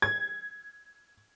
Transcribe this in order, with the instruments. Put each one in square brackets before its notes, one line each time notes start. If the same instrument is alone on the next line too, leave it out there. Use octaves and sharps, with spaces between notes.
[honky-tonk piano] G#6